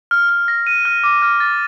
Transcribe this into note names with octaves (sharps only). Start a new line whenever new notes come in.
F6
F6
A#6
D#7
F6
D6
F6
A6